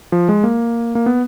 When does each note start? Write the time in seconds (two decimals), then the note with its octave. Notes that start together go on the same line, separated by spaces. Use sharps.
0.12 F3
0.29 G#3
0.44 A#3
0.95 A#3
1.06 B3